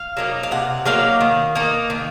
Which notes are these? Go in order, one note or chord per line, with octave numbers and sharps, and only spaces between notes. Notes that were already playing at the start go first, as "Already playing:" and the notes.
Already playing: F5
F#3 A#3 D#4
F5
C3 F#5
F#3 A#3 D#4 F5
D#3
A#3 D#4
D#3